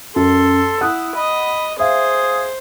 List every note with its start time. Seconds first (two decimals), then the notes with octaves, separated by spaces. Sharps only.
0.16 F#2 A4 C6
0.81 E4 F#5 D#6 F#6
1.16 D#5 B5
1.80 G#4 C5 E5 F5